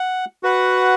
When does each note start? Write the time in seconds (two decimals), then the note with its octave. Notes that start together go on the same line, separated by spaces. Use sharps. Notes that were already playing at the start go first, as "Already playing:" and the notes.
Already playing: F#5
0.43 F#4 B4 F#5